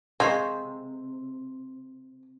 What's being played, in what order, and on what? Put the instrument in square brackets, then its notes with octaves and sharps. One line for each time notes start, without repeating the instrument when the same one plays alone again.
[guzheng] C3 [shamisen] G#3 [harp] C4 C5 [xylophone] F5 C#6 C7